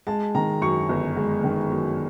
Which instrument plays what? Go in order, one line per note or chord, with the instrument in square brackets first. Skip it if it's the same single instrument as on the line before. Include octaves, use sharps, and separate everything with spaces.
[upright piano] G#3 A5
D#3 A#5
F#2 C#6
G1
G#3
D#3
F#2